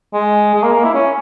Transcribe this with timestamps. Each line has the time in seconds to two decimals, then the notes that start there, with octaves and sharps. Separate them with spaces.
0.14 G#3
0.54 G#3
0.63 A#3
0.74 A#3
0.84 E4
0.94 C#4